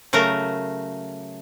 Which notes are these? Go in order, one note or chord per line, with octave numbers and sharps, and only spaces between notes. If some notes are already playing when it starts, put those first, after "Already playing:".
C#3 F#3 A3 A#4